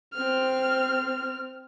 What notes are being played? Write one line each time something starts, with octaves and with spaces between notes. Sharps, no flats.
C4 F6